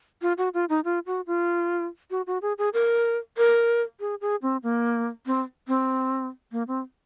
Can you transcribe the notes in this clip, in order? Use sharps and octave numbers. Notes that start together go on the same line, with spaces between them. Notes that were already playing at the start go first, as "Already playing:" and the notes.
F4
F#4
F4
D#4
F4
F#4
F4
F#4
F#4
G#4
G#4
A#4
A#4
G#4
G#4
C4
A#3
C4
C4
A#3
C4